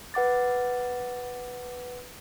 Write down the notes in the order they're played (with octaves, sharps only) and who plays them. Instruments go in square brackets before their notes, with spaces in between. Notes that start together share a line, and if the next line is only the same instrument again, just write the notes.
[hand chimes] B4 F#5 D6 A6